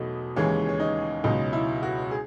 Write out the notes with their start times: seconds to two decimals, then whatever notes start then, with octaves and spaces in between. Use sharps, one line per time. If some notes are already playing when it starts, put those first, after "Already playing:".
Already playing: E2 B2 F#3 A3 D#4
0.36 D#2 C#3 E3 G#3 C#4
0.69 C#4
0.80 D#4
1.24 C#2 B2 F#3 D#4
1.53 E4
1.83 F#4
2.11 G#4